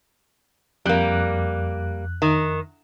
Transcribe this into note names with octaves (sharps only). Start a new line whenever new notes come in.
F2 G3 A#3 F#6
D#3